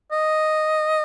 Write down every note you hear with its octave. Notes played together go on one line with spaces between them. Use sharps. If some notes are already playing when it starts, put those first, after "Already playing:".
D#5